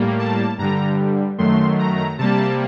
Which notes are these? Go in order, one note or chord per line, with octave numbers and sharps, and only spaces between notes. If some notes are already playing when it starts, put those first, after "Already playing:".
Already playing: A2 G3 A#3
A5
G2 D3 G3 A#5
F#2 D#3 F#3 A3 C6
A#5
C3 G3 A#3 A5